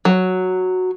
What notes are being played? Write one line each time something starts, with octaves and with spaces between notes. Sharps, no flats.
F#3